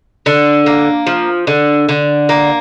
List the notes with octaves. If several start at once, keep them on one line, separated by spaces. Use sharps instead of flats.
D3
A#3
F3
D3
D3
A#3